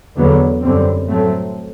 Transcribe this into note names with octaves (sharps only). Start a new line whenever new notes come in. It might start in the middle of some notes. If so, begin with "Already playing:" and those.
E2 D3 F#3 B3
F#2 D3 G3 C4
A2 F#3 A3 C4